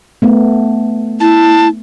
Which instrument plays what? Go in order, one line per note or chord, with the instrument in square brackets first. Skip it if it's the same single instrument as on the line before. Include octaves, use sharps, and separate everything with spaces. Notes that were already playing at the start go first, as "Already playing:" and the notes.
[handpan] A3 B3
[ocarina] E4 [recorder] A5